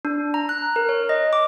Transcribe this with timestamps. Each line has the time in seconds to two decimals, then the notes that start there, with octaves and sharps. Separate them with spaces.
0.05 D4
0.34 A#5
0.49 F#6
0.76 A#4
0.89 C#5
1.09 D#5
1.33 D6